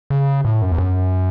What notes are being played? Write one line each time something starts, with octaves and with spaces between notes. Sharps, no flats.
C#3
A2
F#2
E2
F#2